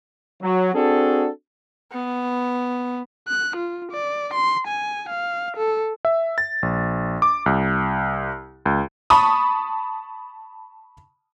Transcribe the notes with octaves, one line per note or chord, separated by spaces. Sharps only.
F#3
C4 D4 F#4 G#4 A4
B3
F#6
F4
D5
C6
G#5
F5
A4
E5
A6
A#1
D6
C2
C#2
A5 B5 C#6 D#6